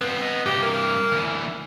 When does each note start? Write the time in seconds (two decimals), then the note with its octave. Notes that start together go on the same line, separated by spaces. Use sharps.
0.01 G2 B3 C4
0.18 C4 D#5
0.46 G2 C3 G4
0.62 A#3
1.12 D2 E3